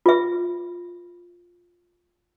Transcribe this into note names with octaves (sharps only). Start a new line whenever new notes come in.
F4 E5